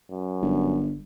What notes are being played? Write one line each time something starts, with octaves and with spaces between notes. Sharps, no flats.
F#2
G1